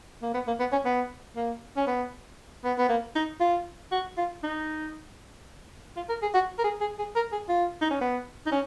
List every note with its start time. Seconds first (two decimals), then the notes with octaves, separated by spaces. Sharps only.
0.22 A#3
0.34 B3
0.47 A#3
0.60 B3
0.72 C#4
0.85 B3
1.36 A#3
1.76 C#4
1.87 B3
2.64 B3
2.78 B3
2.89 A#3
3.15 D#4
3.40 F4
3.92 F#4
4.17 F4
4.43 D#4
5.96 F4
6.09 A#4
6.22 G#4
6.34 F#4
6.58 A#4
6.64 G#4
6.81 G#4
6.99 G#4
7.15 A#4
7.32 G#4
7.49 F4
7.81 D#4
7.91 C#4
8.01 B3
8.46 D#4
8.52 C#4